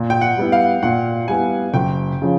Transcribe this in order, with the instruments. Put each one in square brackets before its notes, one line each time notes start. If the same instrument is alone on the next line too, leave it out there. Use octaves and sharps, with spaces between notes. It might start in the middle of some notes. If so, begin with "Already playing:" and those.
Already playing: [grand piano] A#2
[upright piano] G5
F#5
[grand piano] G3 B3 E4
[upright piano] F5
[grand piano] A#2 [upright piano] F#5
[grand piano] G3 B3 E4 [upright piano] G#5
[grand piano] F#1 [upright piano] G5
[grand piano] C#3 F3